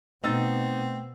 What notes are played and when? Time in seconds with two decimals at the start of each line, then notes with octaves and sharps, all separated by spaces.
0.24 B2 A3 C4 D#4 E6 A6